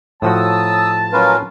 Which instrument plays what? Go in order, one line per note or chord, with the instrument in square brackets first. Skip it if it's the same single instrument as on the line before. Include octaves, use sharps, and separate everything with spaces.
[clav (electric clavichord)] A2 F3 F#4 [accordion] F#3 D#6 E6 [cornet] A5
[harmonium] F#3 B4 F5 [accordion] C#4 F4 A#4